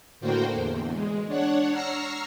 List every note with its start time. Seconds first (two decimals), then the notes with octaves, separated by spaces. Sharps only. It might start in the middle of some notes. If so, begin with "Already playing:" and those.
0.21 A2 D3 A#3 F#4 C5 G5
0.54 E2
0.94 G#3
1.27 D4 C#5 F#5
1.71 A#5 C#6 E6 F6 A#6 C7